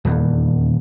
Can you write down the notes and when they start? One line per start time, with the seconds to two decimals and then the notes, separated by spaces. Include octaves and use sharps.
0.05 D#1 E2